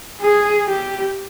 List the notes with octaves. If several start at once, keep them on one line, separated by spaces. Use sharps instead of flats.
G#4
G4